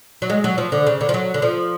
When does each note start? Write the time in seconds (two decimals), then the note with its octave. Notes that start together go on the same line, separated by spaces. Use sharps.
0.22 F#3
0.30 G#3
0.44 F#3
0.58 F3
0.72 D3
0.86 C#3
1.01 D3
1.09 F3
1.14 F#3
1.34 D3
1.42 F3